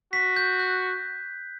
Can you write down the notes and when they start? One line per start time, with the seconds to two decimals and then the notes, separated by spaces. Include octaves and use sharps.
0.13 F#4 B6
0.36 G6
0.59 F#6